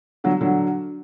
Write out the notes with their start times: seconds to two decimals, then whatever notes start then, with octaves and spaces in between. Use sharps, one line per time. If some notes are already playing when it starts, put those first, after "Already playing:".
0.24 D3 F#3
0.41 D3 F#3